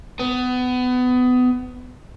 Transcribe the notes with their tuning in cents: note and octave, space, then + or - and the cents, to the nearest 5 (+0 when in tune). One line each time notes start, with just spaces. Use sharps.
B3 +25